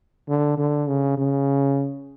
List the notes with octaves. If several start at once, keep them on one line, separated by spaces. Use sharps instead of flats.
D3
D3
C#3
C#3